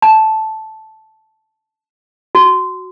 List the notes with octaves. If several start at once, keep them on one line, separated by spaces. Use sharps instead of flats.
A5
F#4